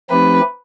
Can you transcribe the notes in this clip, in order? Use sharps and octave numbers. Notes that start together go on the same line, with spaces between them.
F3 A3 C4 D#4 G4 B4